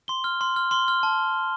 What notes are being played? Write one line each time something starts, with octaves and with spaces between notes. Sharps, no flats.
C6 G7
F6
C6
F6
C6 G7
F6
A5